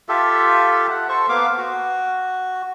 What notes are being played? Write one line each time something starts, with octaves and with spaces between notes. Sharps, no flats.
F4 G4 A4 E5
F#5
A4 C5 C#6
A#3 B3 F5 D6
F#4